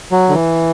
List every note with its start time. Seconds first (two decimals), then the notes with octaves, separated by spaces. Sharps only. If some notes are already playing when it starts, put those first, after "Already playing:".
0.12 F#3
0.29 D3
0.33 E3